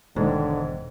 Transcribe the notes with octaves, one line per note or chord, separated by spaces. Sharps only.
E1 D#2 G#2 D3